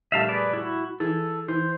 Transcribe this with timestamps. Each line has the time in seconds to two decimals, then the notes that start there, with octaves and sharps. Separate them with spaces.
0.12 A#1 G3 A3 E5 F5 A5
0.29 G#4 B4 D5
0.53 E4 F#4
1.00 E3 G#4 A4
1.48 E3 C5